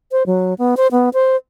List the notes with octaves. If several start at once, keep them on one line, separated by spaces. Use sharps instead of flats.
C5
F#3
B3
C5
B3
C5